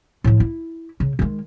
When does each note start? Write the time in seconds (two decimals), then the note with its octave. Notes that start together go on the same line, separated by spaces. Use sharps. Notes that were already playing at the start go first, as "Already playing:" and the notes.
0.24 A2 F3
0.40 E4
1.00 C#3
1.19 D#3 G#3